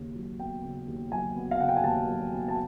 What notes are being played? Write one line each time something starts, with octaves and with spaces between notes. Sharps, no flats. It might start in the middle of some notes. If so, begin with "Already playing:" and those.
Already playing: D#2 C#3
F#3
B3 G5
C#3
D#2
F#3 G#5
B3
F5
C#3 F#5
G5
G#5
D#2 A5
F#3
B3
A5